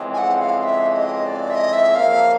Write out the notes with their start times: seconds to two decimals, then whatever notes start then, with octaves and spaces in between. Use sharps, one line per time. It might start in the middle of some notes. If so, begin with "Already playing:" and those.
Already playing: F2 C#3 E3 G#3 C4
0.14 G#5
0.18 F#5
0.36 F#5
0.41 F5
0.60 F5
0.64 E5
0.93 D#5
1.27 D5
1.50 E5
1.55 D#5
1.73 E5
1.95 F2 C#3 F3 A#3 F5